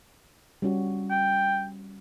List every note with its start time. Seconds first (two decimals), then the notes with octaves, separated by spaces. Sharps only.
0.62 G3 C#4 F#4
1.10 G5